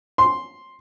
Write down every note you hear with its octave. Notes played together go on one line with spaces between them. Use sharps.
C6